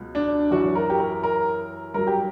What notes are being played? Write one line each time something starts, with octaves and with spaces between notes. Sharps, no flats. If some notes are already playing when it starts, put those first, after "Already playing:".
Already playing: C#2 B2 F#3
D4
F#2 E3 F#4
A#4
G4
A#4
A#4
G2 F#3 A#4
G4